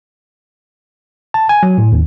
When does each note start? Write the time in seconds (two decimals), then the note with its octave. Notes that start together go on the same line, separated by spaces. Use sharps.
1.34 A5
1.49 G#5
1.63 F#3
1.78 A2
1.92 D#2